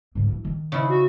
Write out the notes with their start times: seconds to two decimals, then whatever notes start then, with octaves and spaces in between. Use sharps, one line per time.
0.15 G#2 D3
0.29 E4
0.45 D#3
0.72 C#3 E4
0.89 F#4